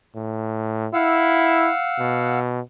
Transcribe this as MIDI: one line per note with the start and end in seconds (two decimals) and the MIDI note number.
0.16 0.87 45
0.94 1.70 64
0.94 2.39 77
0.94 2.39 78
0.94 2.39 88
1.99 2.60 47